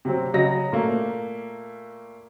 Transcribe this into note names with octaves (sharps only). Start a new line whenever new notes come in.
C3 F#3 C4
C#3 F#3 D#5 A#6
A#2 A3 A#3